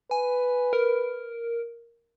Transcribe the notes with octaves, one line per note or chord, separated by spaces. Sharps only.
B4 G#5
A#4